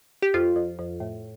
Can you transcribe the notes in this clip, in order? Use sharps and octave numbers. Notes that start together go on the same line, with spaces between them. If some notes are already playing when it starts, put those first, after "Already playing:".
G4
F2 F4
F2
F2
A2